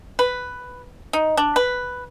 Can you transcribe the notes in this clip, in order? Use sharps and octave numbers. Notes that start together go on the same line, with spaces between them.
B4
D#4
D4
B4